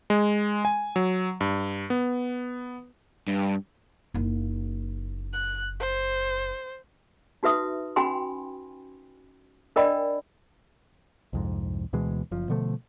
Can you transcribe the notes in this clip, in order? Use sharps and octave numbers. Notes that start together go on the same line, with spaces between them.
G#3
G#5
F#3
G2
B3
G2
F#1 D#4
F#6
C5
D#4 F#4 B4 E5 D#6
C#4 F#4 G5 G#5 B5 C6
D4 A#4 D5 D#5 G5 B5
C2 F2 G#2
D2 B2 E3 G#3
F#1 F3
B2 D3 F3 A3